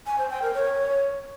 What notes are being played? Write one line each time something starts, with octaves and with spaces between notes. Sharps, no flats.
G#5
C5
G5
A#4
C#5